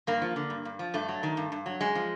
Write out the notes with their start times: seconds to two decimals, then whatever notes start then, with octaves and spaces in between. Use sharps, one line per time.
0.07 G2 A#3
0.22 F3
0.36 D3
0.50 G2
0.65 G2
0.79 F3
0.94 G2 A3
1.08 F#3
1.23 D#3
1.37 G2
1.52 G2
1.66 F#3
1.80 F#2 G#3
1.95 F3